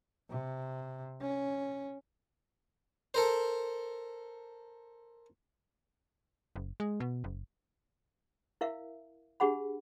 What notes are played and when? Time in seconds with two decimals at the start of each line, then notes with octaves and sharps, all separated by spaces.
0.30 C3
1.21 C#4
3.14 A4 A#4 C5
6.56 F#1
6.80 G#3
7.00 B2
7.24 F#1
8.61 E4 A#4 E5 F5
9.40 D4 G4 G#4 F#5 B5